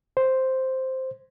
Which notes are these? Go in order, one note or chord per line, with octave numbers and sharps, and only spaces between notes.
C5